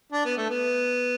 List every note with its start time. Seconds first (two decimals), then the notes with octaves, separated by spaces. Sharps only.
0.12 D4
0.25 B3
0.37 A3
0.50 B3